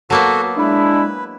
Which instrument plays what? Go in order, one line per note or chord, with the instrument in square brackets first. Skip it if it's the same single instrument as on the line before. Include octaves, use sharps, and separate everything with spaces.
[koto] F#3 A#3 B3 [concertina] F#4 A4
[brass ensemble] G#3 D4 E4 [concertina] B4